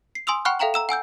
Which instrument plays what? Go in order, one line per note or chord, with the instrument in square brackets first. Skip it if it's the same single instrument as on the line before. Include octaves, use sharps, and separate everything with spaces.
[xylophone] C7
G#5 C6 D#6 E6 F7
F#5 G5 B5 C#6 F6 F#6
A4 E5 F5 G5 A#5 F#7
A#5 E6 E7
F#5 G#5 E6 G6